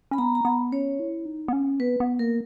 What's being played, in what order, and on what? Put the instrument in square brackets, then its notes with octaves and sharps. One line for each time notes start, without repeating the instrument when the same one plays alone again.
[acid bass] C#4 [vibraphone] B5
[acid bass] B3 [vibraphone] A#5
[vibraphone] A#5
[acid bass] B3 [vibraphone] B5
[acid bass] C#4 [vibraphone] C#5
[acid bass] E4
D#4
B3
C#4
[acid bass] B3 [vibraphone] B4
[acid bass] B3
[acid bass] A#3 [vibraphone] A#4